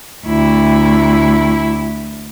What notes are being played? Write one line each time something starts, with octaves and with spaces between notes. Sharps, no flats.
D2 E4